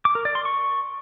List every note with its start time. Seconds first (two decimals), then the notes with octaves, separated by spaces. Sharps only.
0.05 D6
0.15 A#4
0.25 D5
0.35 C6
0.45 C#6